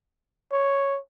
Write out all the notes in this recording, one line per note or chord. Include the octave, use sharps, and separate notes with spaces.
C#5